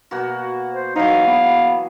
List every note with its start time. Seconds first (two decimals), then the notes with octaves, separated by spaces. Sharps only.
0.11 B2 A#3 F#4
0.72 C5
0.96 E3 F#3 D#4 F5
1.27 B3